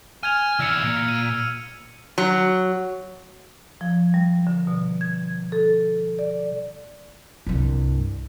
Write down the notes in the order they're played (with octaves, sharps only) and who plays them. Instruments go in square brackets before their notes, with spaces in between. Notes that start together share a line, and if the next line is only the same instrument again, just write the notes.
[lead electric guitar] G#5 [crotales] F6 G#6 F7
[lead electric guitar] E3 D5 [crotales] E6 F6 C#7
[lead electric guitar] A#2
[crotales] D#7
[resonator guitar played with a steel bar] F#3
[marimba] F3
G3
D3
B2
G#6
A4
D5
[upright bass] C2 G2